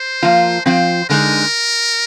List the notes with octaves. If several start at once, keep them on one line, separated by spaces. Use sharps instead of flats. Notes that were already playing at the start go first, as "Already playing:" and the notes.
Already playing: C5
F3 A#3 F4
F3 C4 F4 C5
D3 G#3 D#4 A#4